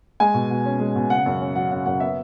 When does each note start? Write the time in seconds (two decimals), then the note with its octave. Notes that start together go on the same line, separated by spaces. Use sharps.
0.20 G#3 G#5
0.34 B2
0.50 B2
0.65 C#4
0.80 G#3
0.95 B2
1.10 C#3 F#5
1.26 F#2
1.41 C#4
1.55 F#3 F#5
1.71 C#3 F#5
1.86 F#2 F#5
2.00 B3 E5